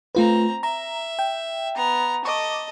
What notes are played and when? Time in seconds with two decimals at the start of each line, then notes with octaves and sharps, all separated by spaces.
0.15 A3 C4 F4 B4 A#5
0.63 E5 A#5
1.19 G5
1.75 B3 A#5
2.25 A4 D#5 C#6 D6